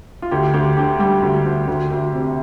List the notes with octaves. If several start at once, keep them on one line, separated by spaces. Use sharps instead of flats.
F4
D2 G4
D2 G4
D3 G4
G3 G4
D2
D2
D2
D2
C3